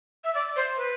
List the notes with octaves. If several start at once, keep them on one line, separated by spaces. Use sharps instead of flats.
E5
D5
C5
B4